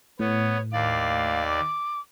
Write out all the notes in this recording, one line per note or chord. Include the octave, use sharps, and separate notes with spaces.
A2 B3 C#5
D#2 D5 F5
D6